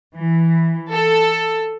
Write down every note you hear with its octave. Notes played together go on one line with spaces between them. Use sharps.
E3
A4